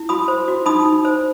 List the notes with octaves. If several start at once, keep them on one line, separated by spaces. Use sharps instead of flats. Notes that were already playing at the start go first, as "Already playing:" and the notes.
Already playing: E4
F#4 B5 D#6
C5
F#4
D#4 B5 D#6
D#4
C5